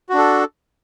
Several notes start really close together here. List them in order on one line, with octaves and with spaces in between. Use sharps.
F#4 D4 A4